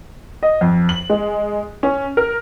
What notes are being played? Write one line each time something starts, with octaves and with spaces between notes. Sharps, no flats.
D#5
F2
F#7
G#3
C#4
A#4